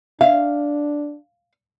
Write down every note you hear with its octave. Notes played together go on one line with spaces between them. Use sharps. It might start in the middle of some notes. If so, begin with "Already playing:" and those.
D4 E5 F5